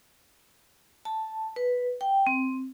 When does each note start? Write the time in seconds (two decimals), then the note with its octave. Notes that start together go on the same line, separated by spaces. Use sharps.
1.05 A5
1.56 B4
2.01 G5
2.27 C4